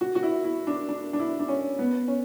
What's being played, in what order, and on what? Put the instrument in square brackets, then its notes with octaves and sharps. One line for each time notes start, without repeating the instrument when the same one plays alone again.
[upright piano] F#4
F#4
E4
E4
D4
D4
D4
E4
D4
C#4
B3
C#4